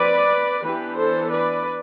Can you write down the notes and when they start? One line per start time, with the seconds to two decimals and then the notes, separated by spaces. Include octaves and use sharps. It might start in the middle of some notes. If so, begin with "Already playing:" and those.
Already playing: F3 C4 B4 D5
0.63 E3 B3 D4 G4 B4
0.97 A4 C5
1.30 B4 D5